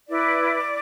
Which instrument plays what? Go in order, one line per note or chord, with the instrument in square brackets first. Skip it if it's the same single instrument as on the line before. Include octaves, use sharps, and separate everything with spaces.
[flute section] E4 B4 D5